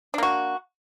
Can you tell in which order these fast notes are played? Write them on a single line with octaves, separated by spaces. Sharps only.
D4 A#3 F#4